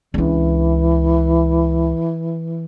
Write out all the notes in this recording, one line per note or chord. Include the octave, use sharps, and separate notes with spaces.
C#2 E3 D4